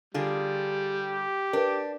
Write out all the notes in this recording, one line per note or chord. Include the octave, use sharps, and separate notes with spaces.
D3 G3 F4 G#4
G4
D4 A#4 B4